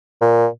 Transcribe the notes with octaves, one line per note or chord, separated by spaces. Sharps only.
A#2